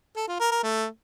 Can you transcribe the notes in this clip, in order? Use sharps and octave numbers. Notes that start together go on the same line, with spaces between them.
A4
F4
A#4
A#4
A3